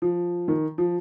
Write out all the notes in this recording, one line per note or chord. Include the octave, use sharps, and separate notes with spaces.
F3
D#3
F3